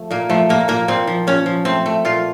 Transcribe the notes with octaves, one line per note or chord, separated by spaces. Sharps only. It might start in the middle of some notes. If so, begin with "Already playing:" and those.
Already playing: F3 A3
A#2 A#3
F3 A3
A#2 A#3
A#2 A#3
A#2 C4
F3
A#2 C#4
F3
A3 C4
A3
A#2 F4